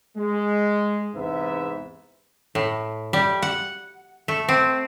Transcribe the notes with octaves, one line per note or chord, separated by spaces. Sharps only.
G#3
E2 G#2 C3 B4 E5
A2
G3
F#5
A3
C4